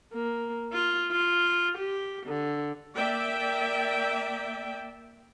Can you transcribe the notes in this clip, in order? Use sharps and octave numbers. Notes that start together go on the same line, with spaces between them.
A#3
F4
F4
G4
D3
A#3 D5 E5 G5